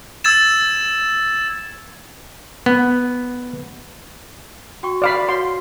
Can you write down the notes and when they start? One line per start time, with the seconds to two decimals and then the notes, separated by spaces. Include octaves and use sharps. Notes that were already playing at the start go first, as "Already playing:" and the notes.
0.24 E6 G#6 A6 E7
2.66 B3
4.83 F#4 G5 C#6
5.02 D5 F5 B5
5.29 F#4 C#5 F#5 C6